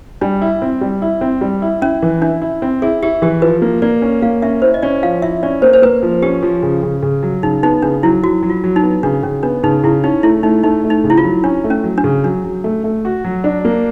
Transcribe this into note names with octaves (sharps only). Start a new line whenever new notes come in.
G3 D4
E4
C4
G3
E4
C4
G3
E4
C#4 E4
E3
D4 E4
E4
C4
E4 G#4
E4 G4
E3 G4
F3 B4
A#3
A#3 D5
C#4
A#3 F5
C#4 E5
E4 C5
D#5
C#4 D5
F3 F5
E4 E5
C#4 D5
A#3 C5
C5
A#3 B4
F3
C#4 G4
F3
C#3
C#3
C#3
F#3
C#3 D#4
B3 D#4
C#3 D4
F#3 E4
F#3 F#4
F#3
F4
F#3
D#4
B3
C#3 D4
C#3 C#4
B3 D4
C#3 D#4
C#3 E4
C#4 D#4
A3 E4
A3 D#4
A3 D#4
A3
D#4
C#3
E4
F4
F#3
C#4 D4
A3
C#4
F#3
D4
C#3
F#3 D4
F#3
A3
A3
F#4
F#3
D4
A#3